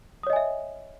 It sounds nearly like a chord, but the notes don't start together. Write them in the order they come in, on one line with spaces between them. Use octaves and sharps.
D#6 C#5 D#5 G#5 E5